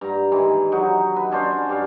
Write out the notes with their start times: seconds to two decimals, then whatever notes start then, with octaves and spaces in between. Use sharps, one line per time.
0.01 G2 A#5
0.32 D#3 E3 G#3
0.72 F#3 D#4 F#4
1.16 B4
1.31 C#4 D4 C5 F5
1.69 G2 G4 C#5 F5